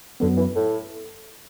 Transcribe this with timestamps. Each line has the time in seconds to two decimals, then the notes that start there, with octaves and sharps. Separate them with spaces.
0.20 F#2 D3 F#3 B3
0.37 E3
0.55 A2